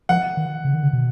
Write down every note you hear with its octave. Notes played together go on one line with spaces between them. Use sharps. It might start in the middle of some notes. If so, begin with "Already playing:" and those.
F3 F#5
D#3
C#3
D#3
C#3
B2